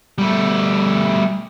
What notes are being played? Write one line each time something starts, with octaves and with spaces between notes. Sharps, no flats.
G3 A3